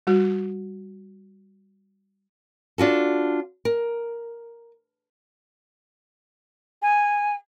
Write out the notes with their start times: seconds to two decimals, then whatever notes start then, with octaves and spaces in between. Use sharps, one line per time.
0.07 G3 F#4
2.78 D4 F4 F#4 A4
3.65 A#4
6.82 G#5